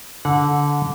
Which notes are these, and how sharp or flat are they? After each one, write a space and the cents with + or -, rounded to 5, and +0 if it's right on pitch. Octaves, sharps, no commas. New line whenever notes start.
D3 -20 F#5 -20